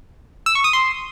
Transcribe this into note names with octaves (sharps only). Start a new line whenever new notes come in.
E6
C#6
D#6
C6